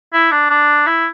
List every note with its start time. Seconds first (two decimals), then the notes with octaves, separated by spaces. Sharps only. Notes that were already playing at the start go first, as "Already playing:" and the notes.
0.13 E4
0.31 D4
0.50 D4
0.86 E4